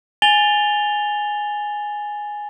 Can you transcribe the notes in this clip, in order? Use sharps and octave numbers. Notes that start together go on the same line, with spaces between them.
G#5 A6 F7 G7